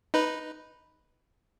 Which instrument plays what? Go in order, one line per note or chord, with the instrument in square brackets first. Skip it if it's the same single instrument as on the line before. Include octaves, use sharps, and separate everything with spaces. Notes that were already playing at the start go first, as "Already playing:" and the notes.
[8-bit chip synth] D#4 B4